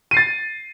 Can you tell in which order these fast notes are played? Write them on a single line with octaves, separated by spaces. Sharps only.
D#7 C7 A6